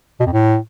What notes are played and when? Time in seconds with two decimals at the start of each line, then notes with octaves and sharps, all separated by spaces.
0.20 B2
0.26 F2
0.33 A2